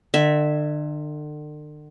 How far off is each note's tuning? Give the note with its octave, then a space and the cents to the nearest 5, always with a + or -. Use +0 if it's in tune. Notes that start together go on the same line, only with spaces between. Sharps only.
D3 +40 E5 -5